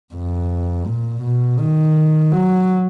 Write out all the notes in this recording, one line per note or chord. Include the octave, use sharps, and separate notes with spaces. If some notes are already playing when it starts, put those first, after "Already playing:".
F2
A#2
B2
D#3
F#3